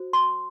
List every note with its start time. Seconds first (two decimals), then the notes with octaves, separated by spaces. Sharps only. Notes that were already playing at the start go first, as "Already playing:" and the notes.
Already playing: F#4 C5
0.13 C6